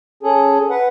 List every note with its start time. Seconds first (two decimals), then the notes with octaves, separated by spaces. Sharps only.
0.23 C#4 G#4 A4
0.70 B4 F#5